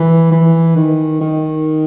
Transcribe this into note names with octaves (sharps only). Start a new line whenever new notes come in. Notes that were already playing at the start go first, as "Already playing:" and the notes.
Already playing: E3
E3
D#3
D#3